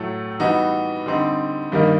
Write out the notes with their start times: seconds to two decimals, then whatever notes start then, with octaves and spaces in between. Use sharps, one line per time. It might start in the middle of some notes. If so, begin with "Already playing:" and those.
Already playing: A2 F#3 A3
0.40 E3 G3 B3 D#4 F#4
1.06 D3 G3 C4 D#4
1.72 G2 D#3 G3 A#3 D#4